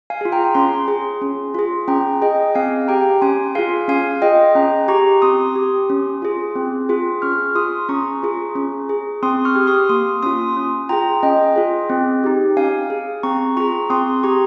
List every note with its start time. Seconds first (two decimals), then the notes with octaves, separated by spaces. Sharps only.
0.10 F5 G#5
0.21 F4 G#4
0.32 G5 A#5
0.44 A#5
0.55 C#4 G#5 C6
0.88 G#4
1.22 C#4
1.54 F4 G#4
1.88 C#4 G5 A#5
2.22 G#4 D#5 G5
2.55 C4 F5 G#5
2.88 G4 G5 A#5
3.21 C#4 G#5 C6
3.55 F4 G#4 F5 G#5
3.88 C#4 F5 G#5
4.22 F4 G#4 D#5 G5
4.55 C#4 G5 A#5
4.88 G4 A#5 C#6
5.22 C4 C6 D#6
5.55 G4
5.90 C#4
6.22 F4 G#4
6.56 C4
6.89 F4 G#4
7.22 C#4 C#6 F6
7.55 F4 G#4 C6 D#6
7.89 C#4 A#5 C#6
8.23 F4 G#4
8.55 C#4
8.89 G#4
9.23 C4 C6 D#6
9.45 C#6 F6
9.56 G4
9.67 C6 D#6
9.89 A#3 C6 D#6
10.23 C#4 F4 C6 D#6
10.57 C#4
10.89 F4 G#4 G5 A#5
11.23 C#4 D#5 G5
11.56 F4 G#4
11.90 C4
12.24 D#4 G4
12.57 C#4 F5 G#5
12.90 G#4
13.23 C4 A#5 C#6
13.57 F4 G#4 A#5 C#6
13.90 C4 C6 D#6
14.23 G4 A#5 C#6